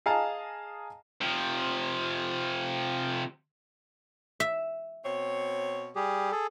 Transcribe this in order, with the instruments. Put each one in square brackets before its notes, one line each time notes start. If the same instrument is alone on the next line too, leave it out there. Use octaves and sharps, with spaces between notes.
[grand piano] G#4 D#5 F5 A5 A#5
[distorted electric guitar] C3 F3
[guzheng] E5
[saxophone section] B2 C4 C#5
[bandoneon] G3 G4 G#4
G#4 A4